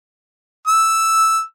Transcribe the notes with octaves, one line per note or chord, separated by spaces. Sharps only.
E6